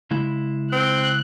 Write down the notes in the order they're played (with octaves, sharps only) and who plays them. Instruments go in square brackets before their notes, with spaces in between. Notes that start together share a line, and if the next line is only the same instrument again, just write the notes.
[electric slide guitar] C#3 G#3 E4
[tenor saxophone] C4 [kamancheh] F#6